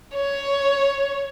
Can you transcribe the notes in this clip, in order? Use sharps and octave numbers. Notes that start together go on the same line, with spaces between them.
C#5